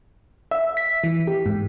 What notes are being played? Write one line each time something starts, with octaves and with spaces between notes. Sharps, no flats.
E5
B6
E3
G4
G#2